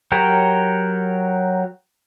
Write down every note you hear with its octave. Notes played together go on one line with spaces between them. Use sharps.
F#3 G4 A#4 C#5